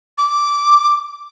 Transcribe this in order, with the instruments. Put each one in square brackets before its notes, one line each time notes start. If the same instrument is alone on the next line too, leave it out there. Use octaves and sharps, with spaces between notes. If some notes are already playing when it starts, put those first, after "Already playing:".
[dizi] D6